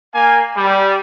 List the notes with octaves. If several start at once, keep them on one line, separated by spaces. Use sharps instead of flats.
A#3 F5 G#5
G3